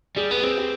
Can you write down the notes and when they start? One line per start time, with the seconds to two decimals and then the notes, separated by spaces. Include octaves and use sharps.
0.16 G3 G#4
0.30 B3 B4
0.43 C4 G#4
0.58 G4